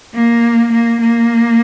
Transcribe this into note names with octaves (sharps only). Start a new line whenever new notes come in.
A#3
A#3
A#3